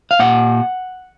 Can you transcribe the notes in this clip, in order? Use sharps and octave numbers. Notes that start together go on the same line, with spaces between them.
F5
A#2 F#5